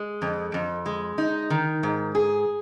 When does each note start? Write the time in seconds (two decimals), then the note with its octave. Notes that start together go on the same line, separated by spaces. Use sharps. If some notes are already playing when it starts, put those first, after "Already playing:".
Already playing: G#3
0.22 F2
0.54 F2
0.86 G#3
1.18 D#4
1.50 D#3
1.83 G#2
2.15 G#4